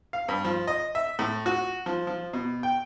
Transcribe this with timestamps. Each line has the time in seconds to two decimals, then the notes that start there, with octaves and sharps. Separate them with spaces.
0.13 F5
0.28 G2
0.45 F3
0.67 D#5
0.95 E5
1.19 A2
1.46 F#4
1.86 F3
2.07 F3
2.33 B2
2.63 G5